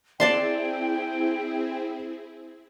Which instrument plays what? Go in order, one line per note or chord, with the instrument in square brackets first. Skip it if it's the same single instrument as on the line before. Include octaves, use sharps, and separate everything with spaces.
[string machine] C4 E4 G#4 [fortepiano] D4 [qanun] D5 A5 C6 [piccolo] G5